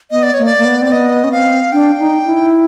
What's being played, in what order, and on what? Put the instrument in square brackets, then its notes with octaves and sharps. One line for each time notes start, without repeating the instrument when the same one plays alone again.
[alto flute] B3 [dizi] D#5
[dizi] D5
[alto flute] A#3 [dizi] C#5
[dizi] D5
[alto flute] A#3
B3
[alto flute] C4 [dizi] D5
[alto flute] B3 [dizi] D#5
[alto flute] C#4
[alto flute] C4 [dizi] F5
[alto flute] D4 [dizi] G5
[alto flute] D#4
E4